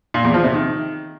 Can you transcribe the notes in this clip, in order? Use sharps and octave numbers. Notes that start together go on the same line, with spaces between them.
A#2
E2
F3
C3
D#3